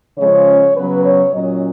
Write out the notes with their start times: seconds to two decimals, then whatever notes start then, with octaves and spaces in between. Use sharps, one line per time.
0.18 C#3 F3 G#3 C#4 C#5
0.76 C#3 F#3 B3 B4
1.04 C#5
1.33 A#2 F#3 C#4 D#5